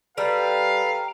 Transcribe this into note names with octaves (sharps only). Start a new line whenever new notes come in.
G3 A4 B4 F5 G5 A#5